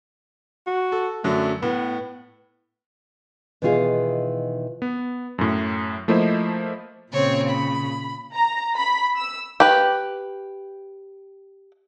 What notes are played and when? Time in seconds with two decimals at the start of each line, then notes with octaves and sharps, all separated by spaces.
0.67 F#4
0.92 A4
1.24 F#2 D3 F#3 A3
1.62 A2 B3
3.62 B2 D#3 E3 F4 G#4 F5
4.82 B3
5.38 F#2 A2
6.08 F3 A3 A#3 E4 C5 D#5
7.12 A#2 C#3 C4 C#5
7.50 B5
8.34 A#5
8.76 B5
9.17 E6
9.60 G4 B4